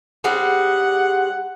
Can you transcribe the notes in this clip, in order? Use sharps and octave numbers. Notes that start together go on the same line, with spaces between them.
G3 C4 G#4 F#5